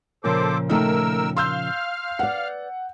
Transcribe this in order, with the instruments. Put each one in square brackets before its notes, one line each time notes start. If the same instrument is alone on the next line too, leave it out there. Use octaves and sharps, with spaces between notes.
[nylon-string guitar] A#2 C#3 F3 [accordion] A4 C5 D6 [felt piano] A#4
[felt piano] D#3 A3 D#4 [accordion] A#4 E6
[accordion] F5 F6 [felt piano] C6 E6 G6
[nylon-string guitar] B4 D5 [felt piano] F#5